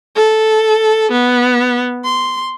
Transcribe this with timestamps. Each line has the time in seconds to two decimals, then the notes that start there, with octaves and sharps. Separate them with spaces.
0.16 A4
1.11 B3
2.04 C6